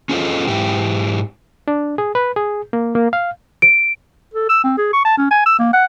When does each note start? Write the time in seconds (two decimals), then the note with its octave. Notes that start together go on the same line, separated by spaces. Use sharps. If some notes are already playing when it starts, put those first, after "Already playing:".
0.09 C#4 F4 G#4 A4 C5 D#5
0.47 G#2 E4 G4
1.68 D4
1.98 G#4
2.15 B4
2.36 G#4
2.73 A#3
2.95 A#3
3.13 F5
3.62 D7
4.34 A4
4.49 E6
4.64 C4
4.78 G#4
4.93 C#6
5.05 A5
5.18 C#4
5.31 G#5
5.46 E6
5.59 A#3
5.73 F#5